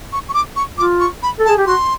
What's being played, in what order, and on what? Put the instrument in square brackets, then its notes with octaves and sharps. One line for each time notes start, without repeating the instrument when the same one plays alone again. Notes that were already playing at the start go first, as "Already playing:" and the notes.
[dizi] C#6
C#6
D6
C#6
[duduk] F4 [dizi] D6
[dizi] C#6
B5
[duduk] A4
[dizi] A5
[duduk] G#4
G4
[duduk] F#4 [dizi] C6